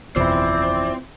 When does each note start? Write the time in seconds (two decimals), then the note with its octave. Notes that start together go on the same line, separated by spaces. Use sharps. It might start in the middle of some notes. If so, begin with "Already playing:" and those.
0.16 F#1 E2 B2 F3 C4 E4 D5